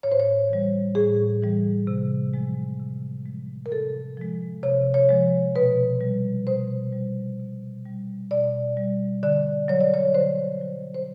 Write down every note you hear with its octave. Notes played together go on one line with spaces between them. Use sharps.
A2 C#5
C5
C#5
E3 G3
A2 G#4
E3 G3
C3
F3 G#3
C3
F3 G#3
A#4
C3 A4
F3 G#3
C3 C#5
C#5
F3 G#3
B2 B4
G3
B2 C5
G3
B2
G3
B2 D5
G3
D3 D5
F#3 C#5
D5
C#5
D3 C5
F#3
C5